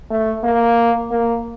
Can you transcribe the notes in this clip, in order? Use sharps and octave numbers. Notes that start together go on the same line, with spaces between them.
A3
A#3
A#3